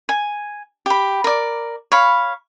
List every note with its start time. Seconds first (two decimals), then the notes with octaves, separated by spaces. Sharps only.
0.09 G#5
0.86 G4 B5
1.24 A#4 D5
1.92 C#5 F5 B5